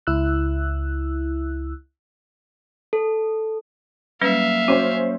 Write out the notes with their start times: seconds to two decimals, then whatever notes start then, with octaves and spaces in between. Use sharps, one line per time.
0.07 C#2 E4 E6 F#6
2.93 A4
4.21 F#3 G3 A#3 C#4 B4 E5 F5
4.68 C#4 F#4 C5 C#5